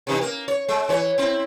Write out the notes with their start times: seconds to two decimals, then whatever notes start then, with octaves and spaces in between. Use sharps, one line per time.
0.07 C3 E3 D#4
0.21 A#3
0.48 C#5
0.68 G#3
0.89 E3 C#5
1.18 C4 E4